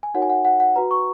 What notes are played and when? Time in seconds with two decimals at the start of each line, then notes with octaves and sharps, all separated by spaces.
0.03 G#5
0.14 D#4 F#4 A#4 C#5 F#5
0.22 G#5
0.30 F#5
0.45 F#5
0.60 F#5
0.76 F#4 B4 A#5
0.91 C#6